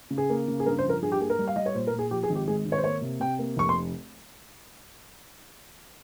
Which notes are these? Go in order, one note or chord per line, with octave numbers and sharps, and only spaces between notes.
C#3
G#4
A#3
C#3
G#4
G2 A#4
C5
F3 A#4
G2 G#4
G4
A#3 G#4
A#4
G3
F5
G3 D#5
C#5
A#2 C5
A#4
A#2
G#4
F3 G4
G#4
G#1
G4
G#3 G#4
G#1
C#5
C5
A#3 C#5
C3
C3 G5
A#3
F1 C#6
C6